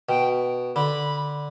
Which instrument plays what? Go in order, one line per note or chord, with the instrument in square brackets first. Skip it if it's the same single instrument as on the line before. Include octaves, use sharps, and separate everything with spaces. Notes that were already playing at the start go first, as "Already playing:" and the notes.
[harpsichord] B2 [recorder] G5
[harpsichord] D3 [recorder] B5